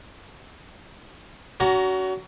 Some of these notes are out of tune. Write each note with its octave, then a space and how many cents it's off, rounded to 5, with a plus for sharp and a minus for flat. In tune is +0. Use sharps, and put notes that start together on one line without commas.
C#4 +40 F#4 +20 A#5 +0